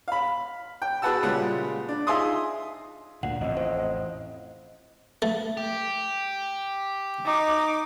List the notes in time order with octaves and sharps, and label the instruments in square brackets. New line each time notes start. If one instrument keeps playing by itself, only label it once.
[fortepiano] F5 B5
G5
F#4 G#4 B4 F#5 A5 E6
A#2 C#3 G3 G#3 F#5
D4
D#4 F4 G#4 E5 C6 D#6
[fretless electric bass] D2 A#2 [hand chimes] F#5
[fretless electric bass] A1 F2 A2 [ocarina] D#5
[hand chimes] C5
[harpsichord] A3
[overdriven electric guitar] G4
[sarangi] D#4 [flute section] D6